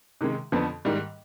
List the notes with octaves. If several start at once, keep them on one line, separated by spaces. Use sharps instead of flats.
C3 D#3 G#3
F2 D3 F3 B3
G#2 D#3 G3